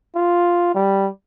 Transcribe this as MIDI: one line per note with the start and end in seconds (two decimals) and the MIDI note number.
0.15 0.73 65
0.75 1.08 55